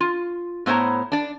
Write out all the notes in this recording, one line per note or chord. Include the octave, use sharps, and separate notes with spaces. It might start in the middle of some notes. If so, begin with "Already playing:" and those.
F4
A2 B3 C5 C#5 A#5
D4 D5